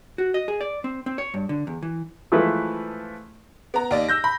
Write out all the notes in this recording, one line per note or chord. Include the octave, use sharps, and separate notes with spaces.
F#4
D#5
G#4
D5
C4
C4
C#5
G2
D3
E2
E3
E3 F3 G#3 A3 E4 B4
B3 A#5
D#2 D5 D#5
E6 G6 A#6
B5